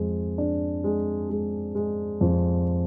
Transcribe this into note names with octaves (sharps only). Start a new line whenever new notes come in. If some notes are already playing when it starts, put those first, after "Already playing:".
Already playing: F2 G#3
D4
G#3
G#3
G#3
F2